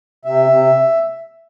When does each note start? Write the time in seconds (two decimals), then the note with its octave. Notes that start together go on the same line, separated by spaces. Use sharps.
0.25 C3 E5
0.49 C3